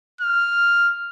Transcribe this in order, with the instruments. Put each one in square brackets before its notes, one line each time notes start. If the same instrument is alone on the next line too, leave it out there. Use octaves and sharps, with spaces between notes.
[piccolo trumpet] F6